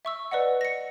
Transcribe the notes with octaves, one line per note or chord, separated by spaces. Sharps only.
E5 C#6 E6
B4 D5 D#5 F#5
A#6 C#7